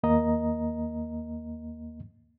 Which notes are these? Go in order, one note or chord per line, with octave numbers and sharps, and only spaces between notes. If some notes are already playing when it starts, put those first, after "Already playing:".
D#2 A#3 D#5 A#5